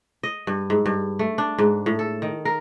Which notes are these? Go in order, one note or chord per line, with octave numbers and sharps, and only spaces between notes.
D#5
G2
G#2
G2
A3
D4
G#2
A2
A4
D#3
A#4